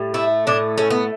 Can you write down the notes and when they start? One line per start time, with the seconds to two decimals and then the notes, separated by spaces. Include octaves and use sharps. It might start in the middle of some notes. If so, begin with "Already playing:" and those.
Already playing: A2 G3
0.14 A3 E4
0.47 A2 D4
0.78 A3 C#4
0.90 B3